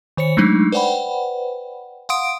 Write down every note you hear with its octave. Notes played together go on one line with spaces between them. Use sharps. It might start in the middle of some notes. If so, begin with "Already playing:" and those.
D#3 C5 C#5 C#7
F#3 G#3 A3 D4 D#4
B4 C5 D5 F#5 G5 B5
F5 F#5 C6 D#6 D7